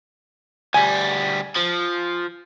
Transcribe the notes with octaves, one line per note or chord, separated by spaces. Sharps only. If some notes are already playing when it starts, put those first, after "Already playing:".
D2 G3 G#5
F3